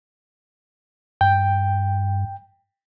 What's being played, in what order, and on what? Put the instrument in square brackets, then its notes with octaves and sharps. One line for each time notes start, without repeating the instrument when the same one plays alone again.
[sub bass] G2 [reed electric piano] G5